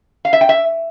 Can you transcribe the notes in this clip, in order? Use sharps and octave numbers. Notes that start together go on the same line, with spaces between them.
F5
E5
G5
E5